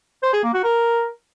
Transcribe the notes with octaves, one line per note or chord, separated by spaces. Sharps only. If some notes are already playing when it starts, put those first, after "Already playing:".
C5
G#4
A#3
F#4
A#4